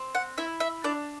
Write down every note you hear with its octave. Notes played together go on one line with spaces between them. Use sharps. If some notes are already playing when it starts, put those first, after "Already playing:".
Already playing: C4
F#5
E4 E5
E5
D4 D5